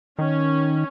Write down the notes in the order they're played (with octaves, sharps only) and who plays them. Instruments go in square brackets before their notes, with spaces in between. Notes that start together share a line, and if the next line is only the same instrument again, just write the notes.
[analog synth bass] D#3 [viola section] C#4